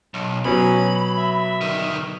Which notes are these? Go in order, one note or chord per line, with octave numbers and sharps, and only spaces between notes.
B1
B2 F#3 C#4 B5
E5
D2 D#3